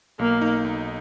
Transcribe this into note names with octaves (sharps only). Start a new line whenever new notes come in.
B1 A#3
D#4
B1